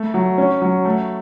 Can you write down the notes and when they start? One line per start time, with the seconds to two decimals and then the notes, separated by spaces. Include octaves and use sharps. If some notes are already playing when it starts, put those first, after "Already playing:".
Already playing: A3
0.14 F#3
0.38 C#4
0.62 F#3
0.85 A3